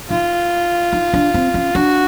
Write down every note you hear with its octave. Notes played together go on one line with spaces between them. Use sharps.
D#4 F4
D#4
D4
C4
C#4
D4 F#4